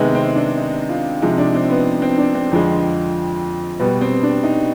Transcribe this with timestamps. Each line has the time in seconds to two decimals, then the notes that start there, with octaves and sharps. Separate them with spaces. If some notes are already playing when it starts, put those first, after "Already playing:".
Already playing: C3 D#3 G#3 B3
0.15 C4
0.36 D4
0.57 D#4
0.89 F4
1.22 C3 F3 G#3 D#4
1.38 D4
1.55 C4
1.70 B3
2.02 C4
2.18 D4
2.35 C4
2.51 F2 D3 F3 G#3
3.79 B2 G3 B3
4.01 C4
4.23 D4
4.43 D#4